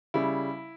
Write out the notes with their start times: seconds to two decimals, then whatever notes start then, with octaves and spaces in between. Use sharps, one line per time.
0.14 C#3 G3 E4